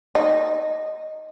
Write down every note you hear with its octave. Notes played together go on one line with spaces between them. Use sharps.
D#4